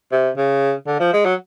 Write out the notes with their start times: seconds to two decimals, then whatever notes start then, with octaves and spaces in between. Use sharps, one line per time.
0.12 C3
0.37 C#3
0.87 D3
1.00 F3
1.13 G#3
1.25 F#3